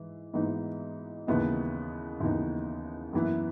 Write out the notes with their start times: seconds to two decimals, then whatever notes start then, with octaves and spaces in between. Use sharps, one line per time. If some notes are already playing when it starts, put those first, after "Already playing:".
Already playing: G#2 E3
0.34 G#2 E3 B3 D#4
1.27 D#2 C#3 E3 B3 D#4
2.21 D#2 C#3 E3 B3 D#4
3.13 F#2 E3 B3 E4